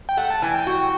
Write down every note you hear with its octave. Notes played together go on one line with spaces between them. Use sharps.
G5
A3 F#5
A5
E3 G#5
G5
F#4